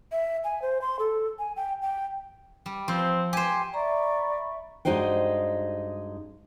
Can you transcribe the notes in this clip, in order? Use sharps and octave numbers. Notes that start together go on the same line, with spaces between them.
E5
G#5
C5
C6
A4
G#5
G5
G5
G3
F3 C4
G4 C5 G#5
D5 E5 A#5 B5 C#6
G2 G#3 D#4 F#4 C5 G5